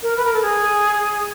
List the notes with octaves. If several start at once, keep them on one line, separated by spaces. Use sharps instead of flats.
A#4
B4
A#4
A4
G#4